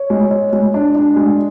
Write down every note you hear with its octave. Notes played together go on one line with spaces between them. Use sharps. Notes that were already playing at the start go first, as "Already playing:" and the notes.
Already playing: C#5
G#3
C#5
G#3
D4
D4
G#3